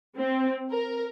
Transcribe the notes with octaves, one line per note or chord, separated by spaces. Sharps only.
C4
A#4